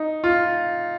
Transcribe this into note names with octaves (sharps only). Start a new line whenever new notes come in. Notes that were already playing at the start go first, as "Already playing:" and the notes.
Already playing: D#4
F4